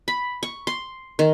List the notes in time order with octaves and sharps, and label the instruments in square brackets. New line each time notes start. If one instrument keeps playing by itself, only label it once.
[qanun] B5
C#6
C6
D#3